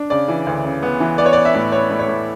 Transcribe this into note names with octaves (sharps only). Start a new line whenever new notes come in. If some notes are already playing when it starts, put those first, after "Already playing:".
Already playing: D4
C#3 D5
E3
D2
C#3
B3
E3
B3 D5
C#5
D5
B3
E5
A2
B3 C#5
A2
C#5
A2